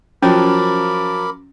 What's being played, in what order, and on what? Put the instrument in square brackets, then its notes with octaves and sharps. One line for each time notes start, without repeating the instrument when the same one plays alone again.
[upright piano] F3 F#3 [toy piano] C#4 [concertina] A#4 B5 D6